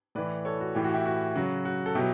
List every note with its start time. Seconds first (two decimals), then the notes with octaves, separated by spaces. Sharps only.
0.15 A2 E3 B4 D5
0.45 A4 C#5
0.60 F#4
0.75 A2 E3 G4
0.84 F#4
0.93 E4 G4
1.06 F#4
1.36 C#3 F#3 F#4
1.65 F#4
1.86 A4
1.95 B2 F#3 E4 G4